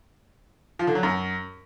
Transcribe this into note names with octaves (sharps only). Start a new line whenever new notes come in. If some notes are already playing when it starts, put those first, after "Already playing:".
F3
D3
F#3
F#2